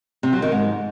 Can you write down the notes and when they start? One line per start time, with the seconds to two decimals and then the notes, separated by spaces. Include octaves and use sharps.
0.23 C3
0.33 F#3
0.42 D#3
0.52 G#2